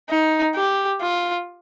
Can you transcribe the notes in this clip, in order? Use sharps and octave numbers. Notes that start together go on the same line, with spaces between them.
D#4
G4
F4